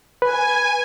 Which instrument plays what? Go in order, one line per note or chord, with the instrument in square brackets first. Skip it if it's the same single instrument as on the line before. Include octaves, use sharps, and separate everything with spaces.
[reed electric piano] B4 [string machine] G#5